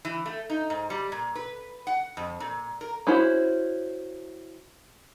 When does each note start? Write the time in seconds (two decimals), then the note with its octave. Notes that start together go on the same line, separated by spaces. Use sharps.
0.05 E3
0.26 A3
0.50 D#4
0.70 G#2
0.90 G3
1.12 A#2
1.35 B4
1.87 F#5
2.17 F2
2.40 A#2
2.81 A#4
3.07 C#4 E4 F#4 C5